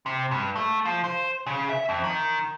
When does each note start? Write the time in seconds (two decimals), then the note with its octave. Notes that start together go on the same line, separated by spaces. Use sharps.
0.06 C3
0.31 G2
0.56 A3
0.85 F3
1.04 C5
1.46 C#3
1.69 E5
1.89 F2
2.04 D#3